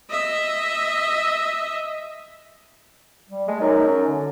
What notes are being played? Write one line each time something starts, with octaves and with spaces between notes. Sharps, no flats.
D#5 E5
G3
G#3 A3
F#2 D#4
C#4
D3